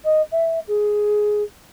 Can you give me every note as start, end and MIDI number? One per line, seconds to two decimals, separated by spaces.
0.04 0.21 75
0.31 0.59 76
0.67 1.42 68